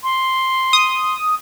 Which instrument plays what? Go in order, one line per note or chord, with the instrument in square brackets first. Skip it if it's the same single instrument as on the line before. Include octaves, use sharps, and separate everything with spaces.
[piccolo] C6
[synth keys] D#6